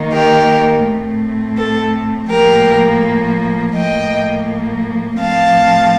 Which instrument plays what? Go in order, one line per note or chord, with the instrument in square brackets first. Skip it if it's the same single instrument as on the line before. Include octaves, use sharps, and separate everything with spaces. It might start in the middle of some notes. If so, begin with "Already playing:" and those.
Already playing: [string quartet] D#3 A#3
G4 A#4
A2 A3 C4
A4
A2 F3 A#3 G4 A#4
A2 F3 A#3 D#5 G5
A2 F3 C4 F5 A5